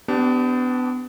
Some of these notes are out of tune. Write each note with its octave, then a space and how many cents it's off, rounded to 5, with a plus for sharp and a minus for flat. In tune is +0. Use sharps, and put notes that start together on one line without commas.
B3 +30 D4 -5 G4 -15